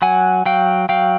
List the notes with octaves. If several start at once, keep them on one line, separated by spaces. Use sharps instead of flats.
F#3 F#5 G#5
F#3 F5 G5
F#3 F5 G5